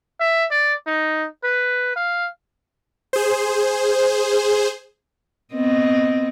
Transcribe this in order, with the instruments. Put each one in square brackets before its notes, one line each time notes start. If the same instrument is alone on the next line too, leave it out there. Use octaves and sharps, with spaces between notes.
[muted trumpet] E5
D5
D#4
B4
F5
[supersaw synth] G#4 C5
[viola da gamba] B3 C4 D#5